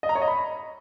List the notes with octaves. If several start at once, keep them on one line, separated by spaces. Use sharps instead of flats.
D#5
A#5
C#5
D#5
B5